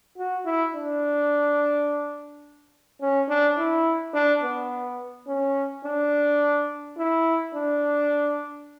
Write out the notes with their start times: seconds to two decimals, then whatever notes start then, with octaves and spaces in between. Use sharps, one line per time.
0.18 F#4
0.45 E4
0.74 D4
3.01 C#4
3.29 D4
3.58 E4
4.14 D4
4.42 B3
5.27 C#4
5.85 D4
6.98 E4
7.55 D4